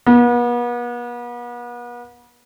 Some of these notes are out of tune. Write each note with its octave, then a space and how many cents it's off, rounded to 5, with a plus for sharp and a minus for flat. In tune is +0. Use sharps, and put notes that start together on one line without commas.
B3 -40